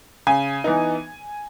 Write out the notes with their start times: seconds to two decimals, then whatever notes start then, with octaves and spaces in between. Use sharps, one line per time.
0.27 C#3 G#5
0.64 E3 B3 D#4